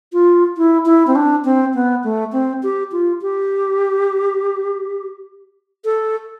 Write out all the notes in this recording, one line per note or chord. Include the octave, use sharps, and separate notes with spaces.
F4
E4
E4
C4
D4
C4
B3
A3
C4
G4
F4
G4
A4